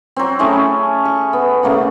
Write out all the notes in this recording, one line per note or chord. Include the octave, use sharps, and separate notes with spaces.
F#3 C4
A3 C#4 E4 G#4
C#6
B3
C#3 A3 A#3 F#5